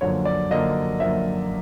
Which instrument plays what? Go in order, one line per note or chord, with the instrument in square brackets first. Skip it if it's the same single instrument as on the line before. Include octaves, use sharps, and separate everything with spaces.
[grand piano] F#2 D3 F3 A#3 C#5
D5
F#2 D3 F3 A#3 D#5
F#2 D3 F3 A#3 E5